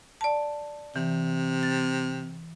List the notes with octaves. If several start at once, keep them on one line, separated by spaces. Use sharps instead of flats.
D5 A5
C3 E3
A6